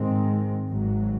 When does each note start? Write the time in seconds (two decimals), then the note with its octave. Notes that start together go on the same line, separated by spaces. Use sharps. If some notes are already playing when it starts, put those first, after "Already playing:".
Already playing: G#2 D#3 G#3 C4
0.70 G#1 G#2 F#3